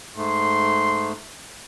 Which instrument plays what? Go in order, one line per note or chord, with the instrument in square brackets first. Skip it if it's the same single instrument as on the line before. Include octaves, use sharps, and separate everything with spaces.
[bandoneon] G#2 A3 [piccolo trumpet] C6